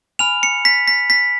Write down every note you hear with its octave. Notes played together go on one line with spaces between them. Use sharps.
G#5 B5 F6 F7
C#7
B6
B6
B6